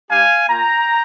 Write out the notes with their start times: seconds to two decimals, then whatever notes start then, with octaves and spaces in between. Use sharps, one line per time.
0.10 G3 D4 G4 F5 G#5
0.49 A#3 F4 G5 A#5